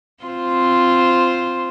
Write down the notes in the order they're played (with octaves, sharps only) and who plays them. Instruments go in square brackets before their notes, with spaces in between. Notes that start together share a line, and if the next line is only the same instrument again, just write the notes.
[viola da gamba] C4 F4 C5